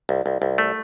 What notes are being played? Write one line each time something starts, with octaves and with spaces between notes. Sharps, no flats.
C2
C2
C2
A3